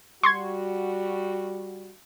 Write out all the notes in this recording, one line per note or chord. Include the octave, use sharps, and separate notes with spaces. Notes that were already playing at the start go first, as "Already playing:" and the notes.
G3 F#4 C6 C#6 G#6